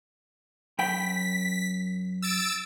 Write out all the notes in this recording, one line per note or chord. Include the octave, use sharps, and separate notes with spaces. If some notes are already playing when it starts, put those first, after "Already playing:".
F#2 G5 B5 B6
E6 A6 D7